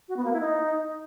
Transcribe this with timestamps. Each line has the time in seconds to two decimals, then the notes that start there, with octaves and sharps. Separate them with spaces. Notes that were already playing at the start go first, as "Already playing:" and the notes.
0.08 F#4
0.16 B3
0.24 A#3
0.32 E4
0.40 D#4